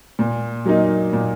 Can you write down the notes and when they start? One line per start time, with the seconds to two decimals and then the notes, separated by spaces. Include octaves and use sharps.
0.19 A#2
0.65 F#3 A#3 D#4
1.13 A#2